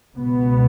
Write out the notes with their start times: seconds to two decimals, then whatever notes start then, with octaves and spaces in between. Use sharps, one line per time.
0.18 C#2 B2 B3